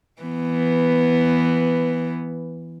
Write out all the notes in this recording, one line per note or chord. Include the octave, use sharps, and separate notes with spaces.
E3 B3